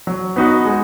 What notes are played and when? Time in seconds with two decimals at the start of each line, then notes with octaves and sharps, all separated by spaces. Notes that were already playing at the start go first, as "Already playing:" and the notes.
0.07 F#3
0.36 B3 D#4 F#4
0.65 G#3